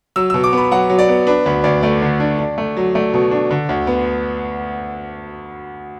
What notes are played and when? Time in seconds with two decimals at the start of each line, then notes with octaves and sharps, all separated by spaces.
0.16 F#3 E6
0.30 B2 E6
0.44 D6
0.53 B3 B5
0.71 F#3 F#5
0.90 F#3
0.99 D5
1.09 B3
1.27 D4 B4
1.45 D2 B4
1.64 D2 D5
1.82 A3 D5
2.02 D3
2.20 D4
2.39 D4
2.58 A3
2.77 F#3
2.95 A3 D5
3.14 B2
3.31 D4
3.51 D3
3.69 D2
3.87 B3